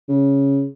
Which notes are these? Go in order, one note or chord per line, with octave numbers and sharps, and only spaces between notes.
C#3